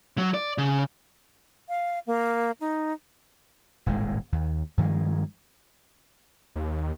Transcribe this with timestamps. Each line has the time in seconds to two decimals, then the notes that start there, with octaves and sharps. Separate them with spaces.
0.18 F#3
0.34 D5
0.58 C#3
1.69 F5
2.07 A#3
2.60 D#4
3.86 D#1 G#1 A2 G#3
4.32 D#2
4.78 G2 D#3 F3 G#3
6.55 D#2